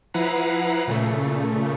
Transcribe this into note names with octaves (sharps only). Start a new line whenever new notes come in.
F3 E4 B4 F#5 A#5 C7
A#2 C#3 A3